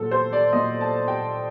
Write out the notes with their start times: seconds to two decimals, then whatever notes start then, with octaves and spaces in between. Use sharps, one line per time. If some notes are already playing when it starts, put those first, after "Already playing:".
Already playing: A#2 F#3 A4
0.11 C5
0.33 D5
0.53 A#2 F#3 D#5
0.81 A5
1.08 G5